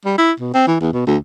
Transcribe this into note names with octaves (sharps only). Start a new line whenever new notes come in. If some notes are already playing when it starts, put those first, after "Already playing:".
G3
E4
B2
C4
E3
E2
B2
D2